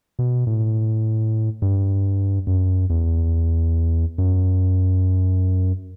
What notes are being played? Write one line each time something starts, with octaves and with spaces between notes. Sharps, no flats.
B2
A2
G2
F#2
E2
F#2